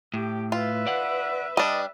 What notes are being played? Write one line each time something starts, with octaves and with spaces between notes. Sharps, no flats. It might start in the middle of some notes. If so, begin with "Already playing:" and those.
A2 G4
F4 B4 E5
D5 F#5
G3 D4 D#5